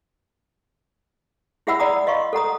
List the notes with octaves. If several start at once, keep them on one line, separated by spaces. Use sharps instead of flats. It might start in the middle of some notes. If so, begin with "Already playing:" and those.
E4 G#4 E5 F#5 B5 E6
D5 F#5 A#5 B5 D#6
D#5 F5 C6 C#6
A4 F#5 A#5 D#6